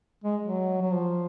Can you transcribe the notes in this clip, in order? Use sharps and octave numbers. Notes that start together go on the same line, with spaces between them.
G#3
F#3
F#3
F3